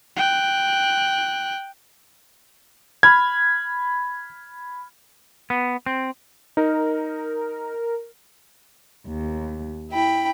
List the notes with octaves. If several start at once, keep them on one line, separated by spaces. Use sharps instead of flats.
G5 F#6
B5 F6 G#6
B3
C4
D#4 A#4
D#2
E4 G5 B5